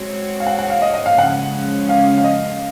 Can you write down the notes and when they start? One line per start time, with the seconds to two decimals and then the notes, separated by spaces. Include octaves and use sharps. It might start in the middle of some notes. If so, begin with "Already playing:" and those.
Already playing: G#3 C4 F#4 C#5
0.40 F5
0.47 F#5
0.59 F#5
0.70 F5
0.82 D#5
0.94 D#5
1.06 F5
1.18 C#3 F3 G#3 C#4 F#5
1.89 F5
2.18 F5
2.24 D#5